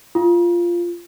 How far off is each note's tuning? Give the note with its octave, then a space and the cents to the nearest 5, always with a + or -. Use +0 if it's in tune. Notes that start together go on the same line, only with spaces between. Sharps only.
F4 -10